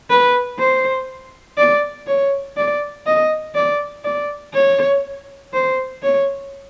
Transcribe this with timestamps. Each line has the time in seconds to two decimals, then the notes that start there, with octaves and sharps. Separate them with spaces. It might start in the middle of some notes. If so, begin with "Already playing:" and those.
0.10 B4
0.59 C5
1.58 D5
2.07 C#5
2.57 D5
3.06 D#5
3.55 D5
4.04 D5
4.54 C#5
5.53 C5
6.03 C#5